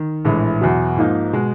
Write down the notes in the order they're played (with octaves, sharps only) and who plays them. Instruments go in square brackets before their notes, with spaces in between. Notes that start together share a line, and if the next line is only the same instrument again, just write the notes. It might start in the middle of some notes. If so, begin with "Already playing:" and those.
Already playing: [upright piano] D#3
A#1 A2 E3 G#3
E2 B2 F#3
G#2 F3 A#3 D#4
B2 G#3